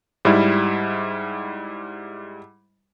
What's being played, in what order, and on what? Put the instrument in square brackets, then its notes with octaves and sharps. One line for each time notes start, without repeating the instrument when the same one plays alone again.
[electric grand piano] G#2 G3 E4